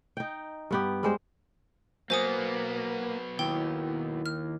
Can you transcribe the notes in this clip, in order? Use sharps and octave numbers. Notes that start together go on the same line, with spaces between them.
D#4 G5
G2 B3 G4
G3 G#3 C5
F#3 A#3 B3 C5 G#5 D#6
D#2 E4 G5
F6